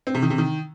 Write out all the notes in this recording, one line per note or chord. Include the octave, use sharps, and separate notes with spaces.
C4
C3
D#3
C3
D#3